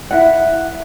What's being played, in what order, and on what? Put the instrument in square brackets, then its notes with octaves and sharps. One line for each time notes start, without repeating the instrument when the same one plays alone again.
[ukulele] E4 F#5